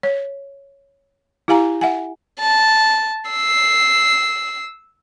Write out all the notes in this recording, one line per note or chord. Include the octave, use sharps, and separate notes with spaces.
C#5
E4 G4 F5 G#5 A#5
E5 F#5 G#5
A5
E6 C7